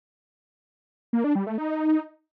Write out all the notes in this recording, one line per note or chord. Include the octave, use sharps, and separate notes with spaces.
A#3
D4
G3
A3
D#4